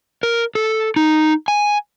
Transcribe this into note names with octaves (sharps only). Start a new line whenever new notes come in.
A#4
A4
D#4
G#5